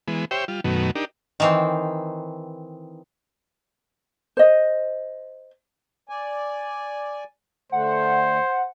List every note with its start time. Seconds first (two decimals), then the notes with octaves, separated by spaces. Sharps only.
0.08 E3 G#3 B3
0.31 G4 C5 C#5 E5 G5
0.48 G3 F4
0.64 F#2 B2 D#3 F#3 A3 B3
0.95 D4 D#4 G4 A#4
1.40 D#3 E3 C4
4.37 C5 D#5
6.09 D5 G#5
7.72 D3 A3 C5 F#5